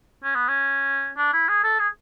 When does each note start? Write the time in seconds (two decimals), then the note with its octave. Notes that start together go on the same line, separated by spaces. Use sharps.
0.23 C#4
0.35 B3
0.48 C#4
1.17 D4
1.33 E4
1.49 G#4
1.64 A4
1.79 G#4